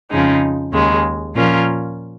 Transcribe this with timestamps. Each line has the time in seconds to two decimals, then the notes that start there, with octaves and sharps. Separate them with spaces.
0.10 F2 C#3 F3 G#3 D#4
0.73 D#2 C#3 G#3
1.35 A#2 F3 C#4 F4 A#4